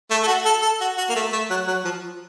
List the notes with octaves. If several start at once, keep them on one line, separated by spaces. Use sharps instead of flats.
A3
A4
F#4
A4
A4
F#4
F#4
A#3
A3
A3
F#3
F#3
F3